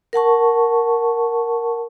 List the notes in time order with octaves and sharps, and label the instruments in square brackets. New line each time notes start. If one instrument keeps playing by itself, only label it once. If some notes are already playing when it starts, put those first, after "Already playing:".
[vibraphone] A#4 F#5 A5 C#6